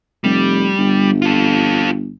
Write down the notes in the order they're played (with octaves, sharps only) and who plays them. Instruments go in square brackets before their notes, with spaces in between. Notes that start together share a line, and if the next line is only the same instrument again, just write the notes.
[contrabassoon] F1 [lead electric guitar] G3
[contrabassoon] G1
[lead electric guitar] F4 A4